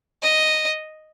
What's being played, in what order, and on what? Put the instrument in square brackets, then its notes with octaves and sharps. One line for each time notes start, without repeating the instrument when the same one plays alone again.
[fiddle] D#5